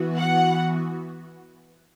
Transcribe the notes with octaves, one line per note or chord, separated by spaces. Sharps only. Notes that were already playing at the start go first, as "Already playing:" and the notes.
Already playing: E3 B3 F#4
F#5